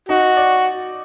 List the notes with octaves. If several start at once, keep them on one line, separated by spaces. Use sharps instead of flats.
D#4 F#4 D#5
D5